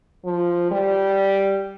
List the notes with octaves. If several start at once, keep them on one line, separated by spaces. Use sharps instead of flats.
F3
G3